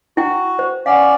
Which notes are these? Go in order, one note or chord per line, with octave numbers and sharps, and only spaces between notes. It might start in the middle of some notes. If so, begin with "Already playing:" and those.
E4 F#4 G5
C5
C#4 D5 F5 F#5